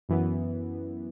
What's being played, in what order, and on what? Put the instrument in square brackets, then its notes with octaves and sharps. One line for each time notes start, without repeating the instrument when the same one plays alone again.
[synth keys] F#2 E3 B3